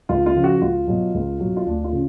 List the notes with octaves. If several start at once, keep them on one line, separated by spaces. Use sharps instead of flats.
C#2 F4
F4
C#3 F3
F#4
C#2 F4
B2 F#3
C#2
B2 F#3
F4
D2 D4
F4
C#3